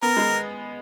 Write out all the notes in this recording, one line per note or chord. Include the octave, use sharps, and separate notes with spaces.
B3 A#4
G#3